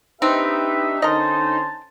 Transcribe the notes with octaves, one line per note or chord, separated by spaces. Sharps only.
C4 D4 D#4 G4 B4 E5
D3 C#4 A#4 C5 D#5 A5